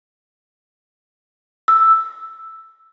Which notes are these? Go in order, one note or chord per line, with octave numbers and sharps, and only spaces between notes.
E6